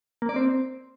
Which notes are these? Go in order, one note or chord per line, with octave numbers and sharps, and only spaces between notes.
A#3
D5
C4